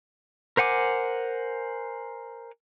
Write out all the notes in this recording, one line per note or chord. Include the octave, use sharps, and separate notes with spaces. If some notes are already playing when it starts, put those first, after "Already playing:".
A#4 C5 F#5 G#5 D6